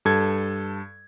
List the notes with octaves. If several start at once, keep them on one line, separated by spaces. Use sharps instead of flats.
G2 A4 G#6